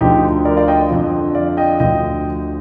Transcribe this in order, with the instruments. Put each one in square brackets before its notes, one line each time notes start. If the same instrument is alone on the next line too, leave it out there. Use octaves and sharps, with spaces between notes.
[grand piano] D2 D3 F3 D#4 G4
A#4 D5
D5 F5
D#5 G5
F2 D3 F3
D5 F5
D#5 G5
D2 D3 F3 D#5 G5